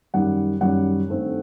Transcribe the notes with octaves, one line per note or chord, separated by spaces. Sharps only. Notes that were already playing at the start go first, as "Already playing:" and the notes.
F#2 D#3 G3 F#5
F#2 D#3 G3 F#5
G2 D#3 A3 C4